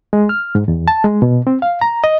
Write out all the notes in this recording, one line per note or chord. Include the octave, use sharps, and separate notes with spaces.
G#3
F6
G#2
E2
A5
G#3
B2
C4
F5
A#5
D#5